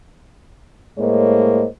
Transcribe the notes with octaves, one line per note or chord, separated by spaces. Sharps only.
A2 G#3 A#3 C5 C#5 D#5